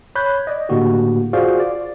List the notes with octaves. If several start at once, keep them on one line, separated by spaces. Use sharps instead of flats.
C#5 B5 F#6 G6
D5 D#5
A2 D3 A#3 F#4 G4
F4 F#4 G#4 C5 D5 F5
D5